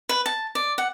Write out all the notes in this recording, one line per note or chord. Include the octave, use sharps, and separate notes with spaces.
B4
A5
D5
F#5